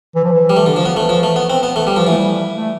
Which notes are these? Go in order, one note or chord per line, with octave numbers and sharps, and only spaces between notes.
E3
F3
E3
G3
A3
D3
F3
B3
E3 A3
F3
A3
B3
C4
B3
E3 A3
G3
F3
E3 A3
G3
A3